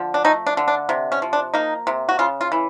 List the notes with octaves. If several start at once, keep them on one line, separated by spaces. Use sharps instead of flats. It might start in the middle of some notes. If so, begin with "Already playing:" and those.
Already playing: D3 F3
D4
A3 D#4
D4
D3
D4
C3
C#4
F3
D4
A#3 D#4
C3
F#4
C#3 F4
F4
E3